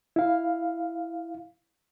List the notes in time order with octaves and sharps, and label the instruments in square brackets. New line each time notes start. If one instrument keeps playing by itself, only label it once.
[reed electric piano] E4 F5